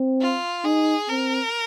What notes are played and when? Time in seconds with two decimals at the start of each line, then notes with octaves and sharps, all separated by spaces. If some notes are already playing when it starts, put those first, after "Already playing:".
Already playing: C4
0.21 F4
0.65 D#4 G#4
1.09 C4 A#4